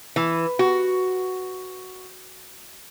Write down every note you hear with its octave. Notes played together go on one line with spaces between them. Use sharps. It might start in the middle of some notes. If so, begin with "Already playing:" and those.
E3
F#4